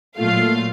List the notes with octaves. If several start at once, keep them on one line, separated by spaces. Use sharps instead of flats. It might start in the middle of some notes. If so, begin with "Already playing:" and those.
A#2 F#3 A3 F4 F5